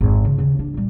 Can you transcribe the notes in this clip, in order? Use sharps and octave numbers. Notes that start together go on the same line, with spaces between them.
G#1 F2
C#3
D#2 C#3
D4
A#2 G3